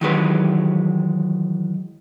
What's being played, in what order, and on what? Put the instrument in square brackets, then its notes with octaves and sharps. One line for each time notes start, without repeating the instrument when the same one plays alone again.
[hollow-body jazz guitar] D#3 E3 F#3 G#3 G4 B4